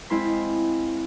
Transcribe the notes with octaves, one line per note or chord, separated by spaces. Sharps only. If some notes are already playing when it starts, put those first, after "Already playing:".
G#3 C4 E4 F5 C6 B6